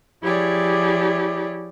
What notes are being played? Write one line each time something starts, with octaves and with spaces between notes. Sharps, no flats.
F3 E4 G4 G#4 C#5 D5